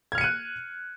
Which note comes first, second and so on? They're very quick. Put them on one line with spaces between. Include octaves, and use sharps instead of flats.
G#6 F6 C#7 D#7 F#6